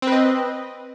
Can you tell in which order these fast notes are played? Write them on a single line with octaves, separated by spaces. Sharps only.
C4 B4 D#5